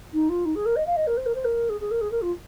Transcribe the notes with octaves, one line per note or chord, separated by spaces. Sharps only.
D#4
F4
D#4
G#4
A#4
D#5
F5
D#5
A#4
C5
A#4
C5
A#4
G#4
G#4
A#4
G#4
A#4
F4